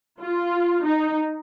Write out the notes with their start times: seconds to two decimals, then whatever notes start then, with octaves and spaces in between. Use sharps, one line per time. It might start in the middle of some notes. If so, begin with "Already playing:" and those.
0.21 F4
0.86 D#4